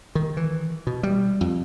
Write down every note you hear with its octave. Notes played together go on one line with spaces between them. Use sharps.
D#3
E3
B2
G3
F2